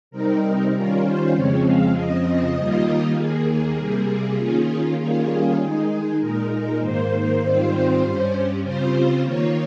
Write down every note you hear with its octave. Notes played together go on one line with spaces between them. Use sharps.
C3 G3 C4 D#4 A#4
D#3 G3 C#4 F4 A#4
C5
F2 C#3 F3 G#3 C4 C#5
F5
F2 C#3 F3 C4 D#5
D#2 D#3 G3 A#3 F4
D#2 D#3 A#3 G#4
C3 G3 A#3
D#3 A#3 C#4 F4
D#3 G3 A#3 C#4 F4 G#4
D#3 G#3 D#4 G#4
A#2 G#3 D#4 A#4
A#4
G#2 D#3 A#3 C5
G#2 D#3 G3 C4 F4
G2 G3 C#4
C#3 G3 C4 F4 C5
D#3 A#3 F4 C#5